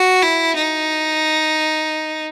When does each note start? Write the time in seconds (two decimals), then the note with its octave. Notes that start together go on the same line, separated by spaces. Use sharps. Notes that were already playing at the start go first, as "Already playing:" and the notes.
Already playing: F#4
0.22 E4
0.55 D#4